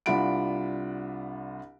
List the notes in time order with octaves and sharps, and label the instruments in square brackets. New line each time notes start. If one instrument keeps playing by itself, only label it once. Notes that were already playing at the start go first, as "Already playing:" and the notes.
[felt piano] C2 D4 F4 F#5 B5 D7